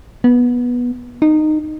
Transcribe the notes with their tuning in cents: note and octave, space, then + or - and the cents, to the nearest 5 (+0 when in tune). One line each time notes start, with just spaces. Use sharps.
B3 -15
D#4 -15